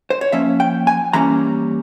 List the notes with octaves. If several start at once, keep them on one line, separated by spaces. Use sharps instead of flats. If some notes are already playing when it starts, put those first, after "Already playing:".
C5
C#5
F3 A#3 C#4 E5
G5
G#5
E3 G3 A#3 C#4 A#5